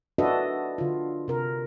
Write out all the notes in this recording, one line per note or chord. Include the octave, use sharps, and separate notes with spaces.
D4 F#4 A4 B4 D#5 E5
D3 F4
C3 A#4